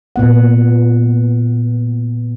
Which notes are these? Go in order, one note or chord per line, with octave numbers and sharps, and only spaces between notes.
A#2 B3 F#5